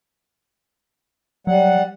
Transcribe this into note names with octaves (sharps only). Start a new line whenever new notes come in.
F#3 G3 F#5